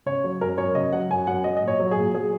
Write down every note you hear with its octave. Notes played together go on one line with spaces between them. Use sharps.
C#3 C#5
F#3
F#2 A#4
F#2 C#5
C#3 D#5
F#3 F#5
F#2 G#5
F#2 F#5
F#3 D#5
D#5
A#2 C#5
F#3
G#4
A#2
F#3 G#4